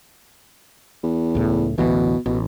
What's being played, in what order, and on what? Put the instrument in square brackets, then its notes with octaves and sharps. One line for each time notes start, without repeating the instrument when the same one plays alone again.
[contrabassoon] E2
[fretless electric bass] C#2 A2
[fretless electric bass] A1 D2 E3 [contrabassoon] B2
[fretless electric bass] A1 [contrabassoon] B2